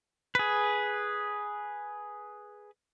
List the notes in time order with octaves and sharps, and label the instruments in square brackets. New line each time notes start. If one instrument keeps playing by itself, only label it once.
[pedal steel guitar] G#4 B4